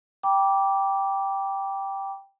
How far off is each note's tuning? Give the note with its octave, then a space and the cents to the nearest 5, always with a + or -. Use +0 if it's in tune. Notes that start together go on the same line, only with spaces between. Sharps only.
G5 +0 B5 -45 D6 -10